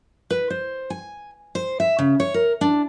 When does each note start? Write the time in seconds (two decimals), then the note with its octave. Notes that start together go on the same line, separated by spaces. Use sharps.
0.30 B4
0.50 C5
0.90 G#5
1.55 C5
1.80 E5
1.99 C#3
2.20 C#5
2.34 A#4
2.61 D4